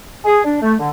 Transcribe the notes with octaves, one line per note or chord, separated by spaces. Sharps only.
G#4
D4
A3
D3